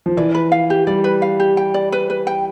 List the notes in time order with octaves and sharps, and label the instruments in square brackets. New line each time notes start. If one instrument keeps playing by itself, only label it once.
[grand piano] F3
[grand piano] E3 [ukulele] D5
[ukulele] B4
F5
G4
[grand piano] G3 [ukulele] D5
[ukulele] B4
F5
G4
G5
D5
B4
B4
G5